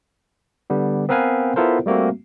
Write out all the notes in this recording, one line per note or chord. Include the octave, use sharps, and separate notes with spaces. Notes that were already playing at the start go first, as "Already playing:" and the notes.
D3 G3 B3
B3 C4 A#4 B4 F5 G#5
B3 E4 F4 A4 A#4 C5
G3 A3 A#3 C4 F#4